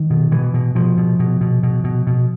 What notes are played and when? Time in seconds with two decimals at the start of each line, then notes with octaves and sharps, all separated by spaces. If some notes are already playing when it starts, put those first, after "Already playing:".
Already playing: D#3
0.10 B2
0.31 B2 E3
0.54 B2
0.75 B2 F3
0.97 B2
1.19 B2
1.41 B2
1.63 B2
1.84 B2
2.07 B2